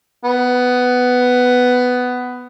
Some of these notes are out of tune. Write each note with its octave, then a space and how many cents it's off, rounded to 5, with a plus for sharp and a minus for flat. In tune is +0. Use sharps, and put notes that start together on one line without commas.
B3 +10